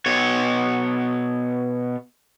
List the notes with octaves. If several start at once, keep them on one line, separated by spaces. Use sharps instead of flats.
B2 C#5